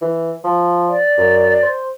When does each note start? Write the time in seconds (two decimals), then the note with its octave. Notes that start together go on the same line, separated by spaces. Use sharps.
0.02 E3
0.44 F3
0.88 D5
1.18 F#2
1.63 C5